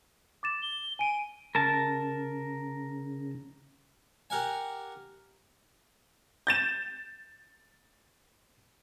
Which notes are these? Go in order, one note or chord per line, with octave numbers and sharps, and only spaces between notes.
D6 A6 E7
G7
G#5 D7 D#7
C#3 A#4 A5
G4 A#4 F#5 G#5
G6 A6 E7